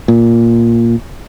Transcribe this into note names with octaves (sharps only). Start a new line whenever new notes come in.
A#2